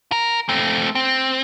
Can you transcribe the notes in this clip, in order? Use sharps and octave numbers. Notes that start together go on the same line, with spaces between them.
A#4
A3 C4
C4